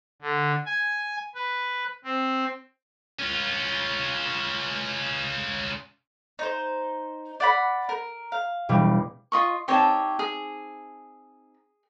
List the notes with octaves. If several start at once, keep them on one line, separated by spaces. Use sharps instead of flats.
D3
G#5
B4
C4
C#4 F4
D#4 C5
D5 F#5 B5
A#4
F5
E1 G3
F4 D#5 C#6
C4 D#4 G4 C#5 A5
G#4